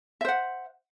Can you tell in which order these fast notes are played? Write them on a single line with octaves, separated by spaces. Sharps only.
E5 C5 F#5